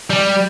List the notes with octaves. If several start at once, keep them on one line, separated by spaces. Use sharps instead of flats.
G3